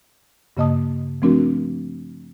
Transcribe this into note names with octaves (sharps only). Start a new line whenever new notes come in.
G2 C#3 A#3 D#5 A5 D#6
F3 A3 C4 D4 F#4 A#4